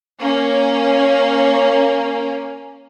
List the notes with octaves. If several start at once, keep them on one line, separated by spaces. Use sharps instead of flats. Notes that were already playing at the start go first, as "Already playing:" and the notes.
A#3 C#4